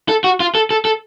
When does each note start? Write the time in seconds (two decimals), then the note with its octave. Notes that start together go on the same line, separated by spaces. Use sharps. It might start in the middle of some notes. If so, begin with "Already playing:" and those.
0.09 A4
0.24 F#4
0.40 F4
0.55 A4
0.71 A4
0.85 A4